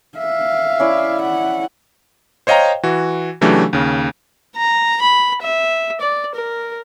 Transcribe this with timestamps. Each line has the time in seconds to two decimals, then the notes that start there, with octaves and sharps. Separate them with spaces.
0.18 E5 F5
0.80 C#4 E4 D5
1.23 F#5
2.47 C5 C#5 D#5 F5 G5 A#5
2.83 E3 F#4
3.41 C#3 E3 F#3 A3 D4 G4
3.73 D#2 C#3
4.56 A#5
5.01 B5
5.42 E5
6.01 D5
6.35 A#4